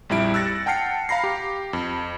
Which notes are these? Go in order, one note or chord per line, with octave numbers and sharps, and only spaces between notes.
A#1 F2 G3 E4 D7
E6 F#6 A6 A#6 C#7
F#5 G5 A5 F6 C7 C#7
F5 A#5 B5 A#6 C7
G4
F2